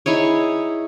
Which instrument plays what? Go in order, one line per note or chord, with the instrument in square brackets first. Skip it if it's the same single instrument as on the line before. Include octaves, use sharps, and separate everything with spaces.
[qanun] D#4 E4 G#4 C#5